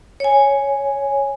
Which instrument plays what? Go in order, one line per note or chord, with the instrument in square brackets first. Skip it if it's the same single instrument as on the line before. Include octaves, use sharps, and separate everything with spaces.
[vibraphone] C#5 G#5